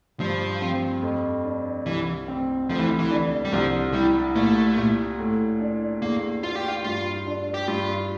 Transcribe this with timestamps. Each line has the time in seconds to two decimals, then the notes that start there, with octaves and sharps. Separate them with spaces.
0.20 G2 F3
0.61 C4
1.02 F2
1.45 D4
1.86 C2 E3
2.28 C4
2.69 D2 F3
2.78 E3
2.99 E3
3.11 D4
3.45 G3
3.52 C2 F3
3.93 G3 E4
4.36 A#2 A3
4.77 A#2
5.19 A2
5.60 D4
6.02 E2 A#3
6.43 D4 F4
6.55 G4
6.68 F4
6.84 G2 F4
7.26 D4
7.54 G4
7.68 G2 F4